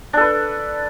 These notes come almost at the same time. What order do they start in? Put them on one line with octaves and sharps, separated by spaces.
D4 A4 B4